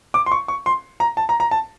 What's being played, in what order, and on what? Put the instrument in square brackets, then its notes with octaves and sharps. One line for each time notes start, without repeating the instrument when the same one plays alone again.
[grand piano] D6
C6
C#6
C#6
C6
A#5
A5
A#5
A#5
A5